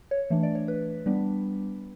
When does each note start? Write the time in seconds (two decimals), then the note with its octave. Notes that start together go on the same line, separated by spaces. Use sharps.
0.11 C#5
0.30 E3 A3 D4
0.43 D5
0.55 C#5
0.68 B4
1.06 G3 B3 D4